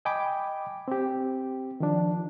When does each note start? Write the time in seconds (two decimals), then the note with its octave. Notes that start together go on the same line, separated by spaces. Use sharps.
0.05 D#5 G5 G#5 B5 D6
0.88 C4 G4
1.80 D#3 F3 D4